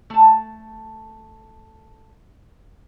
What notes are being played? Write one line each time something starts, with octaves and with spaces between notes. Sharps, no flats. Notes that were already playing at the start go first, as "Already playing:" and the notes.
A3 A5